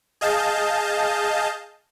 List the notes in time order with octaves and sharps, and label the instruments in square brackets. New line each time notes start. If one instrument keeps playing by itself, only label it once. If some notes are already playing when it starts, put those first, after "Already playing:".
[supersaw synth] G#4 D#5 F5 A5 G6